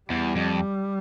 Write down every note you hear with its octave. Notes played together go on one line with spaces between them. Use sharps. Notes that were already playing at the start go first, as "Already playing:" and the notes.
E2 G3
F2